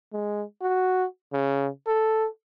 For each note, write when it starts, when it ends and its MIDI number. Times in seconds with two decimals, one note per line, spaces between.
0.13 0.43 56
0.62 1.05 66
1.33 1.68 49
1.87 2.27 69